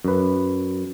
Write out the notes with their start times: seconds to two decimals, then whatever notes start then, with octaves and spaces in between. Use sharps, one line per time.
0.05 F#2 B4